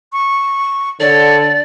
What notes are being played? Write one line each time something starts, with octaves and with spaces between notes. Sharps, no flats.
C#6
D3 A4 C#5 D5